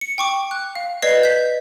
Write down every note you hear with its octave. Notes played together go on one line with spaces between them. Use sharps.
C#7
G5 C#6 D6
F#6
F5
B4 D5 D#5 G#6 C7
G6 B6